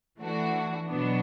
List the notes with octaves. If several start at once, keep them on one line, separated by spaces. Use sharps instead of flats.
E3 A3 D4 F#4
B2 F#3 B3 D4